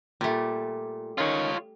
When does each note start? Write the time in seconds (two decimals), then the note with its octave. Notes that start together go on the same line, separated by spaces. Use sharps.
0.21 A#2 G3 A3
1.18 D#3 C#4 F4 C#5